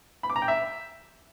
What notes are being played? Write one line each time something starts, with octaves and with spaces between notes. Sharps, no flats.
B5
D6
A#5
G5
E5